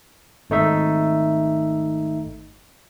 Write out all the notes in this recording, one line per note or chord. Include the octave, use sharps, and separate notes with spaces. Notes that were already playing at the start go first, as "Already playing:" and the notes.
G#1 A3 D#4 E5